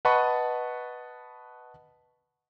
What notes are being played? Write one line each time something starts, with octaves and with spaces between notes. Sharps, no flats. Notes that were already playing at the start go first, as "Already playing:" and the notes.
B4 D#5 F#5 A5 B5 C#6